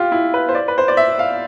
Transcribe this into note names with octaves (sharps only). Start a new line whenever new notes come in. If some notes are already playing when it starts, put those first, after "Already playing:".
Already playing: F4 G4
E4
B4
C5
D5
B4
C5
D5
E5
F5